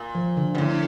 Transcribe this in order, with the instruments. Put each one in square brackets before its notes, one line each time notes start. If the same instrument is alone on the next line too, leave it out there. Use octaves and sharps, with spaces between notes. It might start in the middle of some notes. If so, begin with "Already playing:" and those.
Already playing: [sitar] A#2
[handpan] F3
D3
[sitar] G2
[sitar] A2 [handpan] D3